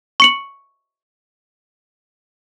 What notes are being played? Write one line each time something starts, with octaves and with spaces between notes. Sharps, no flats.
C#6 C#7 F#7